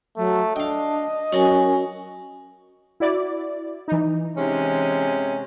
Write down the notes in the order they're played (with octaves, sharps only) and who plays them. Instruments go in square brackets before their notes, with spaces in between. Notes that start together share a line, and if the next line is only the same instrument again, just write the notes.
[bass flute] F#3 [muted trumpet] A3
[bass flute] D4 [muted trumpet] D#5 [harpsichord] F5 G5
[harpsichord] F#3 [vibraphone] C#4 A#4 G#5 [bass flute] F#4
[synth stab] E4 F#4 D5
E3 D#4
[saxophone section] C3 G#3 C#4